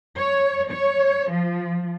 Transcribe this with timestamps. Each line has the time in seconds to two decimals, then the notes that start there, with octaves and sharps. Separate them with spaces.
0.17 C#5
0.70 C#5
1.31 F3